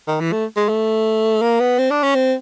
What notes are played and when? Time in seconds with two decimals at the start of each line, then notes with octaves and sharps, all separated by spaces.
0.08 D#3
0.20 E3
0.32 A3
0.56 G#3
0.69 A3
1.42 A#3
1.60 B3
1.79 C4
1.91 D4
2.03 C#4
2.15 C4